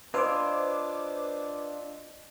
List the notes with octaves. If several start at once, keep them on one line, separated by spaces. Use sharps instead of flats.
D4 F4 B4 C5 D#5 D6 E6 G#6